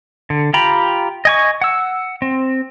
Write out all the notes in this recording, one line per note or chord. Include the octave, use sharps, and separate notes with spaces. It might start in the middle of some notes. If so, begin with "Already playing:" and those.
D3
F4 G4 G5 A#5 B5
D#5 G#5 C#6
F#5 E6
C4